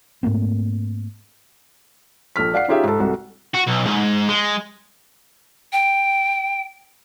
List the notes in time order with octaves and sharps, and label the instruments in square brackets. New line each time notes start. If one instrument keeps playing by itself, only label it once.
[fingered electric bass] G#2 A3 A#3 C4
[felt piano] A#1 A4 F6 B6
D5 F5 F#5 C7
C#4 D#4 F4 G4 G#4 E5
G#2 A4
C2 F#4 A4
[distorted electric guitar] F#4
B1
G#2
G#3
[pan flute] G5